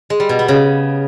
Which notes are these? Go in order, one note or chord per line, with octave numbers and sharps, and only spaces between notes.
G#3
G3
B2
B3
C#3